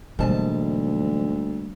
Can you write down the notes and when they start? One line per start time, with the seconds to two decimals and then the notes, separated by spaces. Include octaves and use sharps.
0.19 D2 G#2 B2 E3 F#3 G3 A#3 A5